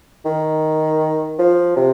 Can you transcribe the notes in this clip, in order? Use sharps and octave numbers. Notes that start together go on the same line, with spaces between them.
D#3
F3
C3